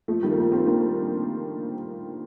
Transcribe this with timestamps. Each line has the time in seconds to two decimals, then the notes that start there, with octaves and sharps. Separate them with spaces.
0.08 F3 A3
0.23 D#3 G3
0.31 A#3
0.37 F3 A3
0.52 A3 C4
0.67 A#3 D4